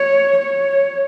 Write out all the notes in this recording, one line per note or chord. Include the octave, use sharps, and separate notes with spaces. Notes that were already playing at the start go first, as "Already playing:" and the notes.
Already playing: C#5
C#5